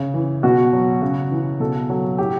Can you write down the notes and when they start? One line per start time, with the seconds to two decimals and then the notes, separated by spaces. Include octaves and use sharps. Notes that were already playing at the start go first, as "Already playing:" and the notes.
Already playing: C#3
0.14 E3
0.43 B2 F#4
0.73 F#3
1.02 C#3
1.31 E3
1.60 B2 A4
1.89 F#3
2.18 A2 G4